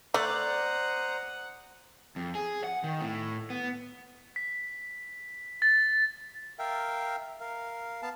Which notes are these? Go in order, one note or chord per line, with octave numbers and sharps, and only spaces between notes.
A3 C5 D5 F#5 A#5 D#6
F2
G#4
F#5
D#3
A2
B3
B6
A6
A#4 E5 F5 G5
A#4 F5
B3 F5 A5